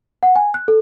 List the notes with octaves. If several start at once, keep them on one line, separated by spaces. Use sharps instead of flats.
F#5
G#5
F#6
A4